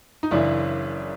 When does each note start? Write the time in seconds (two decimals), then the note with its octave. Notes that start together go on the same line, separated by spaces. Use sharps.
0.23 D#4
0.31 F#1 F#2 C#3 E3 D4 E4